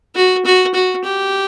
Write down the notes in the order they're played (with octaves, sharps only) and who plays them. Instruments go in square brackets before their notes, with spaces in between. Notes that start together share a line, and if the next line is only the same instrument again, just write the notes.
[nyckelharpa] F#4
F#4
F#4
G4